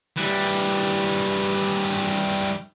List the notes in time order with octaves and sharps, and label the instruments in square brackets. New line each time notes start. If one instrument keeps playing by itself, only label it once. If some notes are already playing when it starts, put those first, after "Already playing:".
[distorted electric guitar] E3 G3